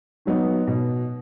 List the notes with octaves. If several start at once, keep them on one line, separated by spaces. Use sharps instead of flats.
D#3 F#3 B3 D#4
B2